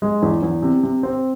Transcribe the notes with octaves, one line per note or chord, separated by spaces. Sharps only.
G#3
E2
E2
C3
C3
C4